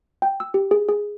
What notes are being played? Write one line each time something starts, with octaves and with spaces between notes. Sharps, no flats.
G5
E6
G4
G#4
G#4